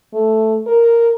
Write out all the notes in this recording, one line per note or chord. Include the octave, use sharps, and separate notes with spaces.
A3
A#4